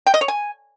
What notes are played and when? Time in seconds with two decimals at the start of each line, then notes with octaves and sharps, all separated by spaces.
0.06 G5
0.14 D#5
0.21 C#5
0.28 G#5